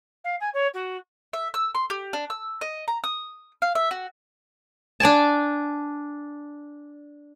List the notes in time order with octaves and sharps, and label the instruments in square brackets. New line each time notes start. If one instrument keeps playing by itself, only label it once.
[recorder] F5
G#5
C#5
F#4
[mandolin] E5
E6
C6
G4
D4
E6
D#5
A#5
D#6
F5
E5
F#4
[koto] D4 D5 G#5 A5